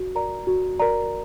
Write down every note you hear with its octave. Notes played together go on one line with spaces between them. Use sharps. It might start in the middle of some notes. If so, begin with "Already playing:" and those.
Already playing: F#4
A#4 D5 A#5
F#4
A#4 D5 A#5